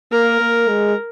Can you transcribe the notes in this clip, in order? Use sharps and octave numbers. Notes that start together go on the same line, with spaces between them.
A#3 A#4
A#3
G#3